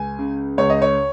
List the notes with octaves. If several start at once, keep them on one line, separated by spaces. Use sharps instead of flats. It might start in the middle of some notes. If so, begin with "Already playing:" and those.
Already playing: C#2 G#5
C#3
C#2 C#5
D#5
C#5